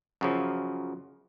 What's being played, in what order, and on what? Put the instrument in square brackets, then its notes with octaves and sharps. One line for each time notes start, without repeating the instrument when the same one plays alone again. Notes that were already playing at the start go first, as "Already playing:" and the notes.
[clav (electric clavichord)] F#2 C#3 F3